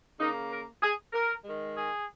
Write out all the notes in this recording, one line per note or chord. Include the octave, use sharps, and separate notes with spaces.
C#3 A#3 D#4
A#4
G#4
A#4
D#3 G#3
G#4